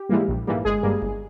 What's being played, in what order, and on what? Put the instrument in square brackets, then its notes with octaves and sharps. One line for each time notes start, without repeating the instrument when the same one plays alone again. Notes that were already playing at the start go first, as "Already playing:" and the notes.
Already playing: [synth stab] G4
G#2 E3 G3 A#3
A#1
G#2 E3 G3 A#3
G1 G#3 G#4
G2 G3 A#3
G1